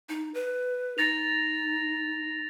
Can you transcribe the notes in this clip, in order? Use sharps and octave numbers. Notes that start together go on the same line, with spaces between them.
D#4
B4
D#4 A6 A#6 F7